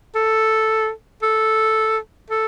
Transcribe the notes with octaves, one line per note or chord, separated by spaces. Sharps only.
A4
A4
A4